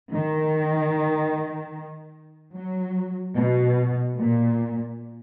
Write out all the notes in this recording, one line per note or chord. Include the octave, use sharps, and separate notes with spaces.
D#3
F#3
B2
A#2